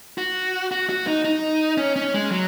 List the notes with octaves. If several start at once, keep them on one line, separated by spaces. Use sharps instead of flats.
F#4
F#4
F#4
D#4
D#4
C#4
C#4
G#3
F#3